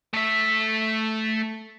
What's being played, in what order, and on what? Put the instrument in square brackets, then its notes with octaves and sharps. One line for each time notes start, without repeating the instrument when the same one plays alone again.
[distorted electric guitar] A3 E5